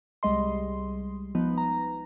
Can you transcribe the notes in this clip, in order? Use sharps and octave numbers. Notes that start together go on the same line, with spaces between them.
C2 G3 G#3 D#5 C6
F3 B3 D#4 B4
A#5